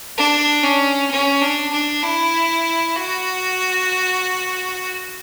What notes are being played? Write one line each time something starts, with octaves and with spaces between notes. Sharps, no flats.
D4
C#4
C#4
D4
D4
E4
F#4